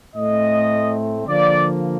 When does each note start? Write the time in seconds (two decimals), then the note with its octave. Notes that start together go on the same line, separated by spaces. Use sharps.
0.16 A2 A3 C4 D#5
1.27 D3 F3 A#3 D5